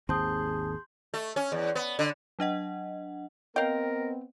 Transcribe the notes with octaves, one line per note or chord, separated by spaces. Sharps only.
G#1 D#2 C4 G#4 A5 C6 D#6 G6
A3
C#4
E2
B3
D3
F#3 D4 D#5 F#5
B3 C4 A#4 D#5 F5 G5